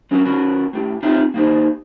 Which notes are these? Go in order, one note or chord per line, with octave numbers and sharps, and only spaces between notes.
F#3 C#4 F#4 A#4 B4
B3 C#4 F#4 A#4
A2 G4
C4 D#4 F4 G4 C#5 E5
A#3 B3 D#4 G4 C5